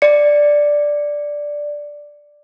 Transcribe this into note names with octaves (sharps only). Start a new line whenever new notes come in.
D5 C#7